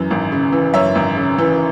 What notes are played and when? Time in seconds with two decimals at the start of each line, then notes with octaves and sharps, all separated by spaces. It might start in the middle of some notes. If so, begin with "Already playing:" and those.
Already playing: F#2 E3
0.11 G#1
0.32 C#3
0.52 E3
0.74 F#2 C#5 E5
0.95 G#1
1.17 C#3
1.38 E3